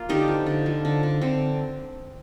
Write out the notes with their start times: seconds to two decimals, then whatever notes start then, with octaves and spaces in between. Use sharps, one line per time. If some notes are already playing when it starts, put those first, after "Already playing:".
Already playing: A#3 F4
0.09 D3 D#4 G4
0.28 F3
0.46 D3
0.66 F3
0.85 D3
1.03 D3
1.21 D3 C4